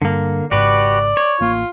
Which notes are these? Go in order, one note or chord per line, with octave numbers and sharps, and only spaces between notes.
G2 D3 A#3
G#1 G#2 C#3 F#4 G4 B4 D5
C#5
A1 A#3 F4